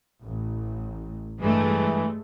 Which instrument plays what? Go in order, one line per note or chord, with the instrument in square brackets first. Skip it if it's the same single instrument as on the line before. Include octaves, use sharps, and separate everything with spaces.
[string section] A1
[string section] G2 G#3 A3 [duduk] E3